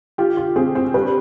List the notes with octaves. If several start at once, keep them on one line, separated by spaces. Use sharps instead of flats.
F4 G4
F4
C4 G#4
C4
G2 B4